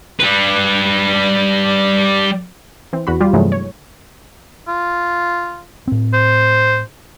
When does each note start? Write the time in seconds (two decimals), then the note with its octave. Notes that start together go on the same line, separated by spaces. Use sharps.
0.20 G3 B4
2.93 E3 C4
3.07 E2 F#4 B5
3.20 G3 F4 G4
3.33 G2 C3 E3 F#3 G#3 A3
3.52 C#5
4.68 F4
5.88 A2 C4
6.14 C5